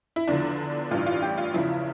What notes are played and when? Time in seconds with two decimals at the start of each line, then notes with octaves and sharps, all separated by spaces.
0.16 E4
0.27 E2 D3 F3 D4
0.91 A1 G2 E3 F4
1.06 F4
1.22 G4
1.38 F4
1.54 E2 C#3 F3 E4